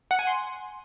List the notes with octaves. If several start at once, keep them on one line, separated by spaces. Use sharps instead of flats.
F#5
G#5
C6